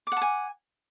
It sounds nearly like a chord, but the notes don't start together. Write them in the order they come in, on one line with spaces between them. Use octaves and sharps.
D6 F#5 A5 G#5